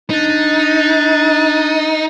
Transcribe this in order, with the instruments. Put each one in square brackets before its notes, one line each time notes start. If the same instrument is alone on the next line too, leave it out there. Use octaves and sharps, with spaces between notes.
[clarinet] D4 [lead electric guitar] D#4